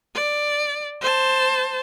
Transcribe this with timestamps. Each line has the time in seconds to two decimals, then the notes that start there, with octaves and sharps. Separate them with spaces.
0.15 D5
1.01 C5 A5